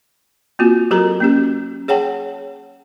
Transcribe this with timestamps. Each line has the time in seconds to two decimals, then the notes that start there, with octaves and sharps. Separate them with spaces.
0.59 A#3 C4 F4 F#4
0.91 F#3 F#4 G4 A4 A#4 A#5
1.20 A#3 C#4 G4
1.88 G#4 C#5 F#5 G5 A5